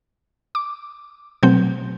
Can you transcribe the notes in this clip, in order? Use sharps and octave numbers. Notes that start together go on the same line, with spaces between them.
D6
B2 F#3 A3 C4 G6